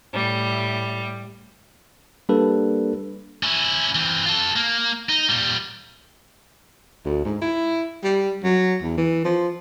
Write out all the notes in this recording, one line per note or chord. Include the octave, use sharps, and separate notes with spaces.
A2 G3
G3 A#3 D4 G4 A4 B4
C#4 E4
E3 C4
F4 A4
A#3
D#4
A#2 G3
D2
G#2
E4
G3
F#3
E2
E3
F3